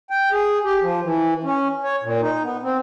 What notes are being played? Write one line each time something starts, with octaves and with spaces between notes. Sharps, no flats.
G5
G#4
G4
F3
E3
C#4
C#5
A#2
D#4
B3
C4